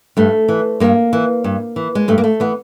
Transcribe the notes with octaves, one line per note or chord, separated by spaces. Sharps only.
G2 A3
E3
G2 A#3
E3
G2
E3
G#3
G2 A3
A#3
A3
E3 B3